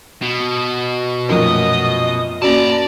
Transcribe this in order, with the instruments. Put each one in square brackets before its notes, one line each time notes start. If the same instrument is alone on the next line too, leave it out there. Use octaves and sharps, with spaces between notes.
[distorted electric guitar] B2
[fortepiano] F#2 A#2 D#3 [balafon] F3 A3 [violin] D#5 D#6
[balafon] A#3 C#4 F#4 [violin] D5 [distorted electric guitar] A5 A#5